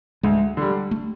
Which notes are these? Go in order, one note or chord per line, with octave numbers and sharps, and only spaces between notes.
D2 G#3
D3 G3
A3